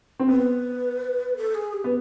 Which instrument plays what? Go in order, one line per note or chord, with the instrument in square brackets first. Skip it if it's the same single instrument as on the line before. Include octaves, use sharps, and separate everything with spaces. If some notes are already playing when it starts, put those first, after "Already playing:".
[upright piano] C4
[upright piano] B3 [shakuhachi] B4
[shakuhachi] A4
G#4
G4
[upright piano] B3